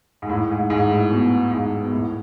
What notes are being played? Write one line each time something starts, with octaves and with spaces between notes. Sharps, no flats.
G#2
A2
G#2
G#2
A2
B2
G#2
B2
A2